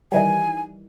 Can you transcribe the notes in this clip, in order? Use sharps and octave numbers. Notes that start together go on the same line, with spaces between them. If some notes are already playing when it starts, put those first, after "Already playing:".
D#3 E3 G3 G#5